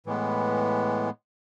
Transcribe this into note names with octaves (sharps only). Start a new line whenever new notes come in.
A2 E3 G#3 B3